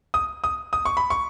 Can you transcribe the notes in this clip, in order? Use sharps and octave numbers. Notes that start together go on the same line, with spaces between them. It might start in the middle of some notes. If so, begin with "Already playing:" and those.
D#6
D#6
D#6
C#6
B5
C#6